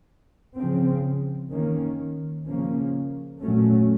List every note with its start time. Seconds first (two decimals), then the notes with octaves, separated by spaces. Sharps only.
0.56 C#3 F3 C4
1.50 D#3 A#3 C#4
2.46 C#3 F3 A#3 C#4
3.42 A#2 F#3 A3 C#4